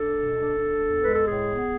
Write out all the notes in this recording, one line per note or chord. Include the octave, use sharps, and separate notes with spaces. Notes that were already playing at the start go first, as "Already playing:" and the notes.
Already playing: D4 A4
B2
D4
D4
E2
G#3 B4
A4
A2 G#4
B3